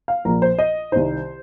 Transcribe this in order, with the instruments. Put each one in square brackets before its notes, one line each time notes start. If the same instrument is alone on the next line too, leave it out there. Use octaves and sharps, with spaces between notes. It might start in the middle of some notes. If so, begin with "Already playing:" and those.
[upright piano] F5
A#1 A#2 F3 A#4
C5
D#5
C2 C3 D#3 C5